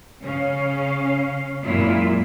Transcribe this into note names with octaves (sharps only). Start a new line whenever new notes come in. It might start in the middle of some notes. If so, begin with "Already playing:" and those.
C#3 C#4 F5
F#2 A#2 G#3 A#3 E4 F4